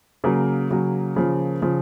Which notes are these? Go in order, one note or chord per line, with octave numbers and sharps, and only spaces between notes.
C#3 F#3 A#3 A#4
C#3 F#3
C#3 F3
C#3 F3